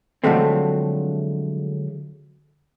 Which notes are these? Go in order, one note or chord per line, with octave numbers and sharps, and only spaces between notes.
D3 F3 F#3 G#3 A3 C4